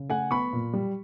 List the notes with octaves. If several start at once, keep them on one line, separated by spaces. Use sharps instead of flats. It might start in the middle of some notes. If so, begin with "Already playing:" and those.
Already playing: C#3
A3 F#5 G#5
B3 B5 C#6
A#2
G3